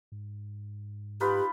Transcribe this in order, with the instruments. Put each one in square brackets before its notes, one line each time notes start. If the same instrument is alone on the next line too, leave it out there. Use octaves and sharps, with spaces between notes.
[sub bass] G#2
[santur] D#4 F4 B4 [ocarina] G4